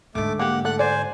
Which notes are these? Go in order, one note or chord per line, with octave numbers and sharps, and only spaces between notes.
G#2 D3 A3 D6
A#3 G4 F#5
A3 F#5 F#6
C5 D5 G#5